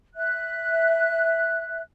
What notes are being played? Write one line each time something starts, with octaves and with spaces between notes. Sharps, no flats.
E5 F#6